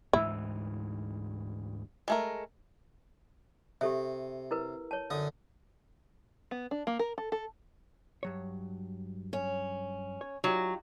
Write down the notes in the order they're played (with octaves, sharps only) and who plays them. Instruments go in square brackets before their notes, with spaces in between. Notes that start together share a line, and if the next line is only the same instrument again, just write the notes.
[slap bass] D2 G#2 E3 [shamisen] E4
[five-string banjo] G#3 A3 A#4
[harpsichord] C3 [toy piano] G4 A4 E5
[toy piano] E4 A#4 B4
C#5 A5
[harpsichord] F#2 D3 D#6
[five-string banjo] B3
D4
A#3
A#4
A4
A4
[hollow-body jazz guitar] G2 F#3 C#5
[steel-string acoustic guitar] C#4
[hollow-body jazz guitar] C#5
[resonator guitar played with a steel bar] F#3 [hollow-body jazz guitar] D#4 F4 G4